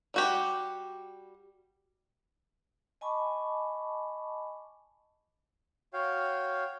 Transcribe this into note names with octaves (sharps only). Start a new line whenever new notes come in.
G3 F#4 G4
D#5 G#5 A5 B5 C#6 D6
F#4 C#5 F5 G5